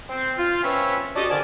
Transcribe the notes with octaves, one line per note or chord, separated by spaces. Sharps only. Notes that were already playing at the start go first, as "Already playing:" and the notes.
C4
F4
C4 C#4 B4 C#5 E5 B5
D4 F#4 G4 A4 D#5
F2 D3 D#3 D5 G#5 A5